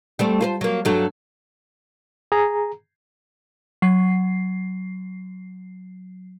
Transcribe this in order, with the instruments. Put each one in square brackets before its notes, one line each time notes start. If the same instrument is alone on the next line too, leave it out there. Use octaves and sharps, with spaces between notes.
[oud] G3 A3 C4
F4 B4 C5
F#3 A#3
G2 F#3 A3
[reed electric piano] G#4 A#5
[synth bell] F#3 C7